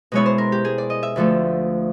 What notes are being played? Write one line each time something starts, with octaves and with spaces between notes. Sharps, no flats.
B2 G#3 B3 E4 C#5
C5
A#4
G4
G#4
D5
D#5
E5
D2 D3 F3 A3